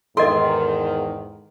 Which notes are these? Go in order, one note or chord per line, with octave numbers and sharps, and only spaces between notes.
E2 G#2 D#3 A4 A#4 D#5 C6